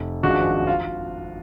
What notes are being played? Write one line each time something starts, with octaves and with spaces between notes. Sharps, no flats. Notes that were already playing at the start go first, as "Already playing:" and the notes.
Already playing: F1
G#1 F#2 F3 G#3 D4 F#4
F4